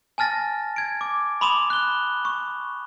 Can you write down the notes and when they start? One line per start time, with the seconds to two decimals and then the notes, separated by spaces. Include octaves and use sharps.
0.18 G#5 A5 F6 A6 A#6
0.76 G#6 D7
1.01 D6
1.41 B5 C6 D6 D#6 E7 F7
1.70 F#6 G7
2.25 C#6